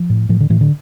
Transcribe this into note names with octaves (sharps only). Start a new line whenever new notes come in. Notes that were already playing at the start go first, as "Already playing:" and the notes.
Already playing: F3
A2
A2 F3
D3
A2 E3
D3